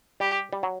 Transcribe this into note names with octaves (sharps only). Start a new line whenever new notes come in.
G3 G4
G3
F#3